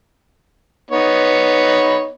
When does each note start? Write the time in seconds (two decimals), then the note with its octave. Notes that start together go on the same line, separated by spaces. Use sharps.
0.91 B3 D#4 C#5